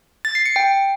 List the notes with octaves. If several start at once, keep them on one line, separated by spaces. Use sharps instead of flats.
A6
C7
C#7
G5